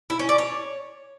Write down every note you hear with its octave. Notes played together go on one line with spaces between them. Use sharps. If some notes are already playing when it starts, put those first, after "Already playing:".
E4
C#4
D5
C#5